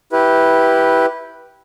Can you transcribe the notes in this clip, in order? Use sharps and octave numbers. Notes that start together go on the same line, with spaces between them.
E4 G4 B4